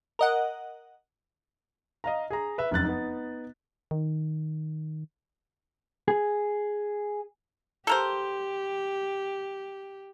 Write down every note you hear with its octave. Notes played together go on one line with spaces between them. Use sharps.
A#4 D#5 F#5
D#5 F5 A#5
G#4 A#5
B4 E5
F1 F#2 F#6 A6
B3 D#4
D#3
G#4
G4 A4 A#4 C5